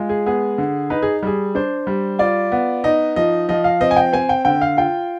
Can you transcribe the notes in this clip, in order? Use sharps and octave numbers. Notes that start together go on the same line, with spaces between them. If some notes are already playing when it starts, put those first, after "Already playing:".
Already playing: G#3 F4
G#4
B3 G#4
D3
D#4 B4
G#4
G3 G#4
D4 C5
G3
F4 D5
B3
D#4 D#5
F3 D#5
F3 D#5
F5
C4 D#5
G#5
G5
C4 G#5
G5
D3 G5
F5
F4 G5